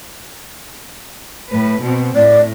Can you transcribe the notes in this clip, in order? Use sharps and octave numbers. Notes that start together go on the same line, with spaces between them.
A2 B4
B2 C4
A2 D5